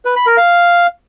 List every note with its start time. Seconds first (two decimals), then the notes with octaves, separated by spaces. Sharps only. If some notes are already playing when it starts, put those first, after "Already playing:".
0.05 B4
0.16 B5
0.27 A#4
0.38 F5